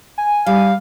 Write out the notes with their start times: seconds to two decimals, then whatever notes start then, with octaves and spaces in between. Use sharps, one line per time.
0.18 G#5
0.46 G3 F5